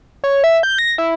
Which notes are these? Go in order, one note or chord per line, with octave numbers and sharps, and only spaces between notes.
C#5
E5
G6
A#6
E4